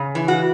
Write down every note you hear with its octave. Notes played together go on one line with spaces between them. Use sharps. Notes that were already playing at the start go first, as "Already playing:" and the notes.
Already playing: C#3
E3
F#4